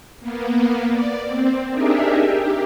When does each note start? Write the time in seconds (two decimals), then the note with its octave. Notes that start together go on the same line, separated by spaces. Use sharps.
0.20 A#3 B3
0.90 D5
1.25 C4
1.72 D4 D#4 G4 G#4 A#4 E5
2.30 G4